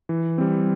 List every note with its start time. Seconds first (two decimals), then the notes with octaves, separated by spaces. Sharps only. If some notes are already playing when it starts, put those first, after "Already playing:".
0.09 E3
0.38 G3 C4